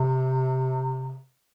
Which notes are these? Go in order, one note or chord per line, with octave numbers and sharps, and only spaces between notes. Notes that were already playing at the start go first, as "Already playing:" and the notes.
Already playing: C3